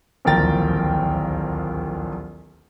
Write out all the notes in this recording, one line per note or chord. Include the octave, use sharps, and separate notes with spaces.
D1 A#1 D#2 A#4 G5 A6